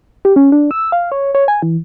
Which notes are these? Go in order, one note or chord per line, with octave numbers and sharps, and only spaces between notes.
G4
C#4
D4
E6
F5
C#5
C#5
G#5
E3